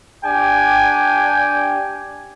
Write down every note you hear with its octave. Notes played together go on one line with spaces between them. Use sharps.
D4 G4 G5 G#5